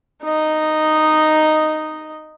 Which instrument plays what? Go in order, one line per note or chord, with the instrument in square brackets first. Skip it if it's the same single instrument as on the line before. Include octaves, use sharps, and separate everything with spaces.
[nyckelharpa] D#4 D#5